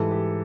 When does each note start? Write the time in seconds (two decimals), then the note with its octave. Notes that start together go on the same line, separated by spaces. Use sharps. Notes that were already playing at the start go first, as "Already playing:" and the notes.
Already playing: G#2 E3 G3 A4
0.11 G4